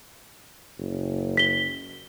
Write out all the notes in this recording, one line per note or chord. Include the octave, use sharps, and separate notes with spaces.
F#1
B6 G7